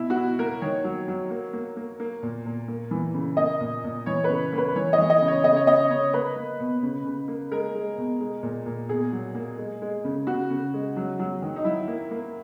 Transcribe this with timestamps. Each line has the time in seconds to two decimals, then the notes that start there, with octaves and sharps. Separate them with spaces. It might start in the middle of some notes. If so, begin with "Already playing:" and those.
Already playing: B2 E4
0.10 F#4
0.16 B2 E4
0.39 A#3 A#4
0.61 D#3 C#5
0.84 F#3
1.08 F#3
1.30 A#3
1.53 A#3
1.77 A#3
2.00 A#3
2.23 A#2
2.46 A#2
2.68 A#3
2.91 E3
3.14 C#3
3.37 A#3 D#5
3.60 A#2
3.84 A#2
4.06 E3 C#5
4.24 C#3 B4
4.53 A#3
4.58 B4
4.76 E3 C#5
4.93 D#5
4.98 E3
5.10 D#5
5.21 C#3
5.28 C#5
5.44 C#3 D#5
5.56 C#5
5.67 C#3 D#5
5.90 C#3 C#5
6.13 A#3 B4
6.36 A#3
6.60 B2
6.83 C#3
7.05 C#3
7.28 A#3
7.51 G#3 A#4
7.75 G#3
7.98 B2
8.21 G#3
8.43 A#2
8.66 A#2
8.89 B2 G#4
9.12 F#3
9.35 A#3
9.58 G#3
9.82 G#3
10.04 C#3
10.27 C#3 F#4
10.50 C#3
10.74 G#3
10.96 F#3
11.19 F#3
11.42 D#3
11.56 D#4
11.64 F#3 E4
11.88 A#3
12.11 A#3